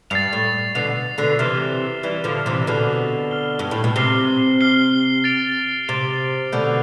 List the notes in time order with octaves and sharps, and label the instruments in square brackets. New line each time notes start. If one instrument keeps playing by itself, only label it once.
[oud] G2 [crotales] A6 C7 F7
[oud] A2
[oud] B2 D3 [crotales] A6 C7 F7
[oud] B2 D3
[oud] C3 E3 [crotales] F6 B6 E7 G7
[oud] E3 G3 [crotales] F6 B6 E7 G7
[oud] D3 F3
C3 E3
[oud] B2 D3 [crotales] F6 C7 G7
[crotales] F6 C7 G7
[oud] G2
A2
B2
[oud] C3 [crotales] F6 C7 G7
[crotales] F6 C7 G7
A6 D7 F7
[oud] C3 [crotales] A6 D7 F7
[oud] B2 D3 [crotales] G6 D7 F7